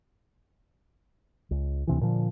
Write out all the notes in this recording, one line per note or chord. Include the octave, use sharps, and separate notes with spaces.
C#2
D2 C3 E3
A#2 D3 F3